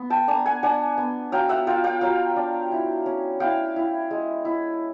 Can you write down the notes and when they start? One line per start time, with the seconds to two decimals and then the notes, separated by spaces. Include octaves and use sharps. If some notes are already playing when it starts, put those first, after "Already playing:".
Already playing: B3
0.10 G5 A5
0.28 D4 G#5 A#5
0.46 F#5 G#5
0.63 D4 F#5 G#5
0.98 B3
1.32 F#3 F5 G5
1.49 E5 F#5
1.67 F4 F5 G5
1.84 F5 G5
2.01 F#3 F5 G5
2.36 D4
2.72 E4
3.06 C#4
3.40 E4 F5 G5
3.76 E4
4.11 G#3
4.45 E4